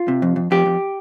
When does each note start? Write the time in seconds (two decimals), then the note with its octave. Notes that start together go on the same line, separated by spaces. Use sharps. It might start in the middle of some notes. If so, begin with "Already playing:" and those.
Already playing: F4
0.08 C3
0.22 F2
0.36 F2
0.51 F2 G4
0.66 F2